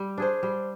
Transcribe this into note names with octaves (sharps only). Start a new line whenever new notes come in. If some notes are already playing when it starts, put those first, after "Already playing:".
Already playing: G3
D4 G#4 C5
G3